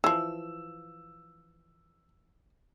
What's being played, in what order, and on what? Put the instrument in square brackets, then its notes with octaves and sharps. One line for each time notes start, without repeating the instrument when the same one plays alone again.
[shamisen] E3 F3 [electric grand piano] E6